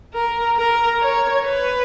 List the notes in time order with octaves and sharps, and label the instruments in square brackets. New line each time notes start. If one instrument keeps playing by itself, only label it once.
[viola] A#4
A#4
C#5
B4